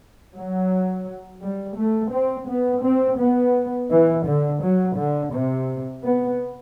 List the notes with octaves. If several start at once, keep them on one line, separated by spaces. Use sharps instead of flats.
F#3
G3
A3
C4
B3
C4
B3
E3
D3
F#3
D3
C3
B3